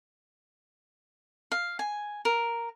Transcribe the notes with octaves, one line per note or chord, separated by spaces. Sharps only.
F5
G#5
A#4